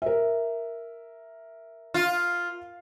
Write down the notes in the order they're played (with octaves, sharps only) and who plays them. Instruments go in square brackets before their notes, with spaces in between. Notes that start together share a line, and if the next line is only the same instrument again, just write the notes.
[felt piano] A#4 E5
[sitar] F4